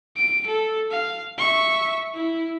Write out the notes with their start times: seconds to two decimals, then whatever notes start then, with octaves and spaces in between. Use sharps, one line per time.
0.16 D7
0.47 A4
0.91 F5
1.38 E5 C#6
2.14 E4